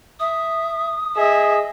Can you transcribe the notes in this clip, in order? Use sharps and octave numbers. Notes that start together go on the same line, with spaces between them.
E5 D#6
G#4 D#5 E5